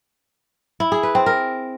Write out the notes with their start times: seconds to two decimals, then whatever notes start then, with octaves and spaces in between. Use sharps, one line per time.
0.80 E4
0.92 G#4
1.03 B4
1.15 C4
1.26 A#4